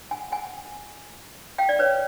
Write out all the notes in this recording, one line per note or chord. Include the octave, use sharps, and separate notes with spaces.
F#5 G#5
F#5 G#5
F5 G5
D5
B4 C#5